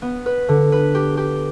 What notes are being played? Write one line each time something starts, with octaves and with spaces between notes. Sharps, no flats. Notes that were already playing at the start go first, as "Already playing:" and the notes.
B3
B4
D3
B4
G4
G4